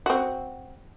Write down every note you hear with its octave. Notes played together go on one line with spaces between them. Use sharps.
C4 F#4